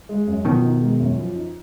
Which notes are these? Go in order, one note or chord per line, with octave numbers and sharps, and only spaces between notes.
G#3
F#2
B2 D#3 F3
D#4
G#3
F#2
F3
D#4